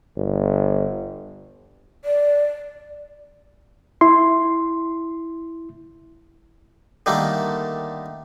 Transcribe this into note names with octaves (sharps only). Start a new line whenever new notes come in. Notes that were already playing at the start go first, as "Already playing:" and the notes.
G1
D5
E4 C6
D3 D#3 G3 A3 A#3